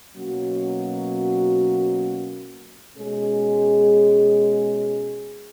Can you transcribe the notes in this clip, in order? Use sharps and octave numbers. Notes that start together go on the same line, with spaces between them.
B2 F#3 A#3 C#4 F#4
B2 G#3 C#4 G#4